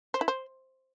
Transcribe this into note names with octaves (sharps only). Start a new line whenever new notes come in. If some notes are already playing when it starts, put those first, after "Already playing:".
C5
E4
C5